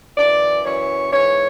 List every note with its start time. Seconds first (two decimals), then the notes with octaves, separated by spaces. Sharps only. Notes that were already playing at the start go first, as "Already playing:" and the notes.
0.17 F#2 E3 D5
0.64 F#2 E3 C#5
1.11 G#2 E3 C#5